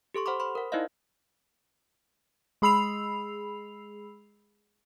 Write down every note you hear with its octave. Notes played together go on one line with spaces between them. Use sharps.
G4 A4 C6 C#6
C5 F#5 B5 C6 D6
C5 B5 C6
A#4 F#5
D#4 E4 C5 D5 D#5 F5
G#3 G#4 B5 E6 C7 F7